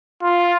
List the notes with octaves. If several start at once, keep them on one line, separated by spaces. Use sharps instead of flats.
F4